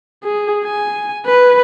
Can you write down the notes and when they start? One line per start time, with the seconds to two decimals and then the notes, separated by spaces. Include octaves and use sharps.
0.24 G#4
0.64 G#5
1.26 B4